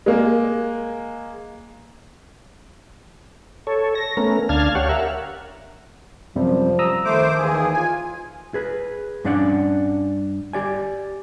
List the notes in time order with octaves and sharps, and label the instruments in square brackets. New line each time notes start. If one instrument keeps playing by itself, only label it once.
[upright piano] G#3 A#3
[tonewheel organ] A4 C#5
A#6
A3 B3 C#4 A#4
D2 D4 F5 A5 F6 G#6
G4 C#5 F5 F#5
A#4 E5 F#5
[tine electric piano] F#2 C3 G3 [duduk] F3
[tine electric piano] A#5 D#6 E6
[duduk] D#3 [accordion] A3 C5 D6
[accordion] D#2 G#4 [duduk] E3
[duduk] F4 [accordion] G#5
[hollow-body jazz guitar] G#4 B4
G2 C#4 D4 D5 F#5
G4 D5 G#5